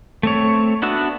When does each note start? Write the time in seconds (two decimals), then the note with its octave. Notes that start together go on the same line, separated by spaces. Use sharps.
0.23 A3 C4 C#5
0.82 B3 D4 F#4 E5